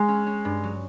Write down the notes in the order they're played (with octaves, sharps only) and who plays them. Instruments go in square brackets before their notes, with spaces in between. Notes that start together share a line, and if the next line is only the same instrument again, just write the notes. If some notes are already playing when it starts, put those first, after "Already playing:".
Already playing: [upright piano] G#3
[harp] C#4
C#4
G2
F#3